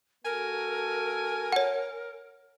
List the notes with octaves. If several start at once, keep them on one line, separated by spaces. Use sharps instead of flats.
A#3 F#4 A4 A#4 G#5
C#5 F#5